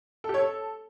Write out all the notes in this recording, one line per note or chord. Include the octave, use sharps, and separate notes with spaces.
A4
G4
C#5
A4